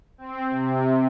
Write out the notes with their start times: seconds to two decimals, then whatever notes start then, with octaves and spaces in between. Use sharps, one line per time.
0.18 C4
0.50 C3